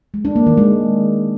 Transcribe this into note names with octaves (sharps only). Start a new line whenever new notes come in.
G#3
D4
A#3
D#3
G#3